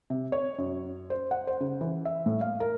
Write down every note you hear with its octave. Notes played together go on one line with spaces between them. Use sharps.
C3
C#5
F#2
C5
F#5
C5
C#3
E3
E5
A2
F5
A#4